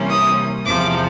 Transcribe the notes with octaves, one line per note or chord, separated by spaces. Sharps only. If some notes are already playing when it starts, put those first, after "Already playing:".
Already playing: C3 E3 G3 A#3 C#4
D#6
E2 C3 F3 D6